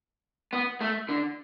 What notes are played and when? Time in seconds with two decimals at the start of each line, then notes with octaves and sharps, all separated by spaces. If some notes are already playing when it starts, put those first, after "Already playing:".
0.53 B3
0.81 A3
1.09 D3